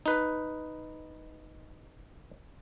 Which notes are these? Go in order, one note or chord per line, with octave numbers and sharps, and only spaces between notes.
D#4 B4